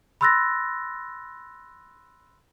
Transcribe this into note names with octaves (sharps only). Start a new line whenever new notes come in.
B5 C6 E6 F#6 A6 A#6